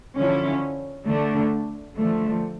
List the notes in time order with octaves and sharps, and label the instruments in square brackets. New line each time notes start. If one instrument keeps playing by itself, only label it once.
[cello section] D3 F3 C#4 E4
D3 A3 D4
D3 F3 A3